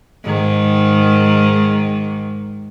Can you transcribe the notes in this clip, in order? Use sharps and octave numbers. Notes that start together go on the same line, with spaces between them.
G#2 D#3